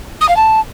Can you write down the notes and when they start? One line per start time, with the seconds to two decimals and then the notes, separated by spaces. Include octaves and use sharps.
0.21 D#6
0.29 F5
0.37 A5